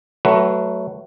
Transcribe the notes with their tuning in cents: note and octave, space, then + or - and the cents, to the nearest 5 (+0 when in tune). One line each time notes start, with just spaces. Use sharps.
F#3 +20 A3 +0 B4 +0